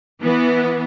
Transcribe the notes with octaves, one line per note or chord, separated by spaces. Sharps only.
E3 B3